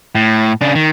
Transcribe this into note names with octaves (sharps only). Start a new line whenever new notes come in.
A2
C#3 D4
D#3